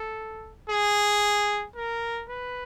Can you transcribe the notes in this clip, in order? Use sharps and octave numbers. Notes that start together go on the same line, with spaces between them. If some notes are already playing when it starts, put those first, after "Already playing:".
Already playing: A4
G#4
A#4
B4